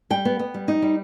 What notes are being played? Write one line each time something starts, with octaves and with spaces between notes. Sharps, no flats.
G3 G5
B3
B3
G3
D#4
G3